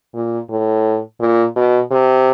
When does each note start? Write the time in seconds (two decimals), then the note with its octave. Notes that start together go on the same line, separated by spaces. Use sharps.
0.14 A#2
0.50 A2
1.20 A#2
1.56 B2
1.91 C3